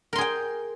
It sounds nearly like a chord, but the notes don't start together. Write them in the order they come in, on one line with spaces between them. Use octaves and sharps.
A#4 C6 G#4 G5